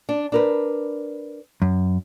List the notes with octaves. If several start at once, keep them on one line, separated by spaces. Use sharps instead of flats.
D4
D4 A#4 B4
F#2